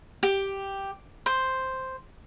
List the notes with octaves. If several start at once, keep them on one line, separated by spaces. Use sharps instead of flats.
G4
C5